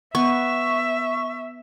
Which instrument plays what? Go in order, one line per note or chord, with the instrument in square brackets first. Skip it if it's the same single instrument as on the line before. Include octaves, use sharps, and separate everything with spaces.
[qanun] B3 [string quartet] E5 [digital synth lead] C#6